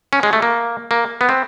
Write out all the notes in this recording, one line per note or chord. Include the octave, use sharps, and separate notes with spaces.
C#4
G#3
A3
A#3
A#3
B3
C4